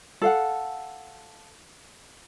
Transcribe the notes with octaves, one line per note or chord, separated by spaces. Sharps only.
A4 F5 F#5